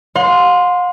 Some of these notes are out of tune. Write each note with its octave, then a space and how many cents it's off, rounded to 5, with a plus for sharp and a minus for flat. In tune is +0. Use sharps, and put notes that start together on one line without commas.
F5 +45 C6 -5